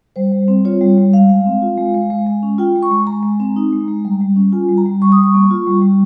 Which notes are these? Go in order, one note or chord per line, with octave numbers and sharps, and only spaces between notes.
G3 C5
G3
C4
F4 C#5
G3
G3
G#3 F5
G#3
C4
F4
G#3
G#3
G#3
G#3
C#4
F4 G5
G#3
C#6
G#3
G#3 A#5
G#3
C4
D#4
G#3
G#3
G3
G3
C#4
F4 G#5
G3
A#5
G3
G3 C#6
D#6
G3
C#6
A#3
F4
G3
G3